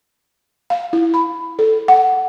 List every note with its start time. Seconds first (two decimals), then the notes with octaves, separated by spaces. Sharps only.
0.70 F5
0.93 E4
1.14 B5
1.59 A4
1.88 F#5